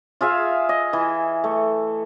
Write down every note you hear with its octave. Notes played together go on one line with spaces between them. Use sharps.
F4 G#4 E5 F5
D#5
E3
A3